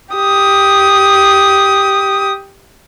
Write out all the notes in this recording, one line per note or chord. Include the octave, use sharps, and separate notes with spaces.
G4 D#6